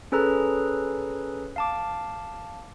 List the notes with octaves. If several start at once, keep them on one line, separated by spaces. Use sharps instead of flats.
C#4 G#4 A4 B4 A#5
F5 A5 D6